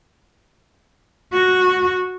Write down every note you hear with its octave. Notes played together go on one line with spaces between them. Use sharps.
F#4